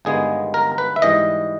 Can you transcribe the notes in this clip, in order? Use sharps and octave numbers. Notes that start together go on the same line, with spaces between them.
G1 G2 D#3 G#3 B3 G#4
A#4
B4
E5
G#2 E3 G3 D#5